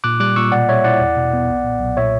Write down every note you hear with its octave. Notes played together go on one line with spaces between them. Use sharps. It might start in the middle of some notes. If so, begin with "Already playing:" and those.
A#2 D6 F#6
G3 D6 F#6
A#2 C#6 E6
B2 D5 F#5
G3 C#5 E5
E4 D5 F#5
E2
B2
B3
B1
A#2
B1
A#2 C#5 E5